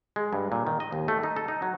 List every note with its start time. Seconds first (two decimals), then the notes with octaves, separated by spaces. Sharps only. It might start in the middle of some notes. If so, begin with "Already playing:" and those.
0.16 G#3
0.33 G2
0.52 A#2
0.67 D#3
0.80 D#5
0.93 D#2
1.08 A3
1.23 D#4
1.36 A4
1.48 D#4
1.62 F#3